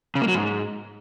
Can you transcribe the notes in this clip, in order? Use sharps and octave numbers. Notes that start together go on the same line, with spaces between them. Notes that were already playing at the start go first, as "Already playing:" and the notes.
C#3
A#3
F#3
G#2